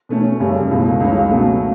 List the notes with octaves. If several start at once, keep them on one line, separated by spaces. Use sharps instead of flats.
B2 A3 C#4
F#2 C#3 G3 C#4
C#2 B2 A3 E4
C#2 C#3 F#3 C#4
B2 F#3 A3 C#4